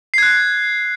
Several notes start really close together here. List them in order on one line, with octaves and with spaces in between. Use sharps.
C7 G#6 F#6